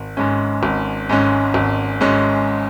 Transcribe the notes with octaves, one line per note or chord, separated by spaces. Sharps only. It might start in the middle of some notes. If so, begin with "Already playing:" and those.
Already playing: G#1
G#2 G#3 C#4
G#1
G#2 G#3 C#4
G#1
G#2 G#3 C#4